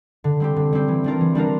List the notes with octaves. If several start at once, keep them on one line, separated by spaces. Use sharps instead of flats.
D3
G3 C4 G4
D3
G3 C4 G4
E3
G3 D4 F4 A#4
E3
G3 D4 F4 A#4